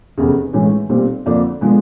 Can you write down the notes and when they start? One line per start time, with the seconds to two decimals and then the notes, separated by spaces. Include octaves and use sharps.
0.18 F1 E2 C#3
0.53 A2 E3 G#3 C#4 F#4
0.89 B1 A#2 G3 C4
1.26 F2 D3 F3 A#3 D4
1.61 D3 F3 G#3 B3